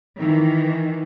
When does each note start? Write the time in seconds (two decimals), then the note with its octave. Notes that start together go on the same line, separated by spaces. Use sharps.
0.18 D#3 E3